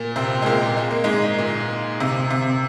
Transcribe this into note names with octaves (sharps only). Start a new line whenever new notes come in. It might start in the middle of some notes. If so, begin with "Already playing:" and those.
Already playing: A#2 A#3
C3 C4
G#3
A#2 A#3
G#3
A#3
G#2 G#3
A#2
C3
C3